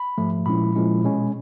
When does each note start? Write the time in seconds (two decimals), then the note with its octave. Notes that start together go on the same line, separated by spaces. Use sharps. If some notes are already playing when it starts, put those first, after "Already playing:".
Already playing: B5
0.18 G#2 F3 A3
0.46 A#2 F3 G#3 C#4 E4 B5
0.75 A#2 F3 G#3 C#4 E4
1.03 B2 G#3 C#4